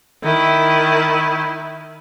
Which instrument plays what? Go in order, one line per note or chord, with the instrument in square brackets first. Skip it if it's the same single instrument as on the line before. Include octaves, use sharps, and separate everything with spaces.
[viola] D#3 E4